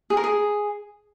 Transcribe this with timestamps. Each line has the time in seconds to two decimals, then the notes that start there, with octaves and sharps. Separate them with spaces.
0.10 G#4
0.17 A#4
0.24 G#4